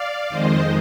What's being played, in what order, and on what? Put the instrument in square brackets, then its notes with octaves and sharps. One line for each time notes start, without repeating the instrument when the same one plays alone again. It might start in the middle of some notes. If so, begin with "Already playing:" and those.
Already playing: [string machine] D5 F5
F2 D#3 G#3 C5 D#5